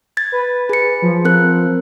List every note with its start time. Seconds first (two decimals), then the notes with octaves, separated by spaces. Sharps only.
0.17 G#6 A6
0.32 B4
0.69 G#4 C#7
1.02 F3
1.25 C4 A#4 F#6